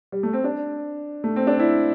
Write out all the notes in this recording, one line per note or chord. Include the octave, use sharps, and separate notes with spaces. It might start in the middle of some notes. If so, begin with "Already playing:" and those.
G3
A3
C4
D4
A3
C4
D4
E4